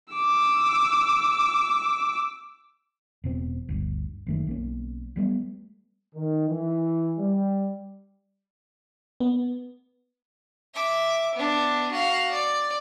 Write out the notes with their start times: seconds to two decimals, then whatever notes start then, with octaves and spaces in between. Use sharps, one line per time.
0.14 D6 E6
3.24 E1 B2 C4
3.69 G1 D2
4.27 F#1 D#3 A3
4.47 B1 A#3 C#4
5.16 F#3 G3 A3 B3
6.15 D#3
6.49 E3
7.19 G3
9.20 B3
10.74 E5 D6
11.35 B3 D4
11.92 F#4 F5
12.31 D5